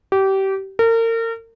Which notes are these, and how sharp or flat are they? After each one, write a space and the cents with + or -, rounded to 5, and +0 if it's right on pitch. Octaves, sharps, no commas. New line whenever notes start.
G4 -25
A#4 -35